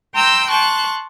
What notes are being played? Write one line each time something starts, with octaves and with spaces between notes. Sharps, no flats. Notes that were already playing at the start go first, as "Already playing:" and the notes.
G5 A#5 C6 E6 G6
A5 C6 C#6 F#6